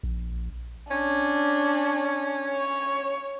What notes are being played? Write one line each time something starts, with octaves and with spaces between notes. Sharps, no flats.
A#1
C#4 D4
C#5